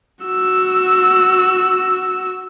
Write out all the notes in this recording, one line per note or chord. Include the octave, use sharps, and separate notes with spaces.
F#4 E6